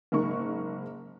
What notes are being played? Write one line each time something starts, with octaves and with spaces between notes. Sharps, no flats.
F#1 G#2 A#3 A#4 C#6